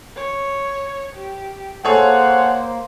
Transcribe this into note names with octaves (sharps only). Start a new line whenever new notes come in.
C#5
G4
A#3 G#4 A4 C5 C#5 F#5